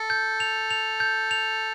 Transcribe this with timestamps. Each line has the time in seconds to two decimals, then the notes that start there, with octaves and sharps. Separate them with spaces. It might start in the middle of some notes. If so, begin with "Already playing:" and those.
Already playing: A4
0.10 G6
0.40 F7
0.71 F7
1.00 G6
1.31 F7